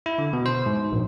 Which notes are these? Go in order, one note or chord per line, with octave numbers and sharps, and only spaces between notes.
E4
D3
B2
C5
G#2
A#1